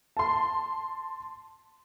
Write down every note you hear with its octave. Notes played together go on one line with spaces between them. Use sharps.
A5 C6